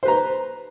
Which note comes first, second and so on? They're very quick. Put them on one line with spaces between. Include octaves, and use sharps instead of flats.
C5 B4 A#5